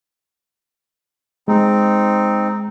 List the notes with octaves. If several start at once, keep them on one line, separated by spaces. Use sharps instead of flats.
G#3 C4 D#4